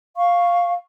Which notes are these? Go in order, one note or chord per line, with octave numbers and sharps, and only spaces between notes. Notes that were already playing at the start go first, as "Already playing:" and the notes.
F5 C#6